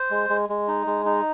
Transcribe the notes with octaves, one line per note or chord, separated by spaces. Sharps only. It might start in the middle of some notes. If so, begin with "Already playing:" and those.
Already playing: C5
G#3
G#3
G#3
D#4
G#3
D#4